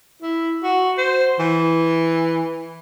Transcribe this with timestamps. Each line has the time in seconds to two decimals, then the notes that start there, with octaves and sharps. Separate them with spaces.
0.22 E4
0.64 F#4
0.98 C5
1.39 E3